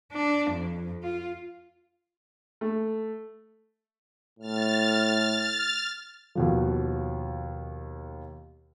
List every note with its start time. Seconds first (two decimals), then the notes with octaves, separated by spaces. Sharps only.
0.12 D4
0.51 F2
1.03 F4
2.61 A3
4.39 A2 F6 A6
6.35 D#2 B2 F3